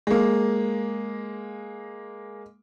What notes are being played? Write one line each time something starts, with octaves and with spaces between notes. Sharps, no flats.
G#3 A#3